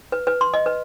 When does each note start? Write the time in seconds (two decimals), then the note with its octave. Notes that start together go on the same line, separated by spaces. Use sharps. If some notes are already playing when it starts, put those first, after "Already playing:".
0.12 B4
0.27 B4
0.41 C6
0.54 D#5
0.66 B4